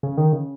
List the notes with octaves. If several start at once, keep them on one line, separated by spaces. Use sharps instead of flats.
C#3
D#3
C#3